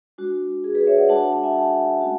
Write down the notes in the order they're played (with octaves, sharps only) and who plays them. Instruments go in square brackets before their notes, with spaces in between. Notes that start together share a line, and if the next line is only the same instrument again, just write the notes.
[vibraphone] G#3 D4 F#4
G#4
G#4 B4
C#5 E5
D5 F#5
G#3 D4 F#4 F#5 A5
F#5 A5
E5 G#5
F#5 A5
A3 C#4 F#4